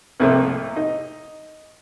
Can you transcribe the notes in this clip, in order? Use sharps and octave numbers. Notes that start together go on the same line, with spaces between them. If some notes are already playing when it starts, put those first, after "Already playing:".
C2 F2 A2 A3 A#3
D#4